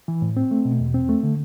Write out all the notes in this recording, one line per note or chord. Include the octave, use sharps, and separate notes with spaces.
E3
A2
C4
A3
B2
E2
C4
A3
D3